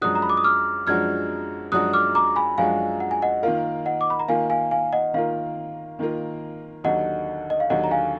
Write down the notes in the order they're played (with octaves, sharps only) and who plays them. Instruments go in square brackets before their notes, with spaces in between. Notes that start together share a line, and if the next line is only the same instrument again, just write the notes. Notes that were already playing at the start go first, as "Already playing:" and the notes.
[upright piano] F#2 F3 G#3 D4 F#4 [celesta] D#6 F#6
[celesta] A#5
B5
D6
D#6
D6 F6
[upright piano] F#2 F3 G#3 D4 F#4 [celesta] F6 G#6
[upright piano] F#2 F3 G#3 D4 F#4 [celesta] D#6 F#6
[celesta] D6 F6
A#5 D6
G#5 B5
[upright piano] F#2 F3 G#3 D4 F#4 [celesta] F5 G#5
[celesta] F#5
G#5
D#5 F#5
[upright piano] D#3 A#3 F4 A#4 [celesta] F5
[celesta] D#5 F#5
D6
B5
A#5
[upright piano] D#3 A#3 F4 A#4 [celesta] F5 G#5
[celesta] F5 G#5
F5 G#5
D#5 F#5
[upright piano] D#3 A#3 F4 A#4 [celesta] F5
[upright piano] D#3 A#3 F4 A#4
[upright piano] D#2 D3 F#3 [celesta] D#5 F#5
[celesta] D#5
F5
[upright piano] D#2 D3 F#3 [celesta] D#5 F#5
[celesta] A#5
F5 G#5